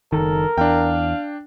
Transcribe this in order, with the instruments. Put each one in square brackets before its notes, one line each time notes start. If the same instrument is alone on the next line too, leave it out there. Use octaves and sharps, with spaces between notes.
[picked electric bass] F#1 B1 D#3 [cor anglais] A4 [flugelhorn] A#4
[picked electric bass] E2 [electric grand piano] D4 G5 [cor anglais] F5